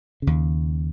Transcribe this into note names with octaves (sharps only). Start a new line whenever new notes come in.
D#2 C#3